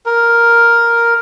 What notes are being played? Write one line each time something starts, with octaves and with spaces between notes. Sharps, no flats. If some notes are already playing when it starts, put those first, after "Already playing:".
A#4